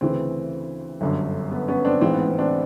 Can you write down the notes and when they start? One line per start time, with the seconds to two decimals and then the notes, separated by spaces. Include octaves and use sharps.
0.01 D2 C#3 E3 C4
1.01 G1 F#2 D3
1.51 B3
1.68 B3 C#4
1.85 C4 D4
2.01 A1 G#2 E3 C4
2.14 B3
2.26 C4
2.39 C4 D4